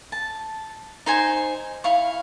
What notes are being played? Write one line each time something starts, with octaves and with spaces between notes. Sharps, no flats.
A5
D#4 C5 G#5
E4 F5 C#6